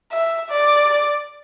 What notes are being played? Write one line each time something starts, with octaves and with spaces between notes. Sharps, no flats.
E5
D5